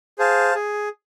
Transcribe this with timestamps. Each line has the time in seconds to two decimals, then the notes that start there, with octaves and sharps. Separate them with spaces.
0.19 G#4 C5 F5 A5
0.55 G#4